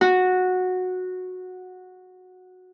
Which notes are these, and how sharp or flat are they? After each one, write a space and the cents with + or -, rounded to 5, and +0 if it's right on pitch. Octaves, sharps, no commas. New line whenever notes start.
F#4 -10